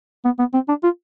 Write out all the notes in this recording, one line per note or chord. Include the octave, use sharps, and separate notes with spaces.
B3
B3
C4
D4
F4